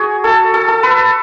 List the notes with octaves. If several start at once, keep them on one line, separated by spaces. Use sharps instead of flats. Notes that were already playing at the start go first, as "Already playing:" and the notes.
Already playing: F#4 G#4
A4
A4
A4
B4